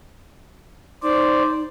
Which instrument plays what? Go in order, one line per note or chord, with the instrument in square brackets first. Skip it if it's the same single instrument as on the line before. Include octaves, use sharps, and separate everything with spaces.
[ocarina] D#4 [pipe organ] C5 D5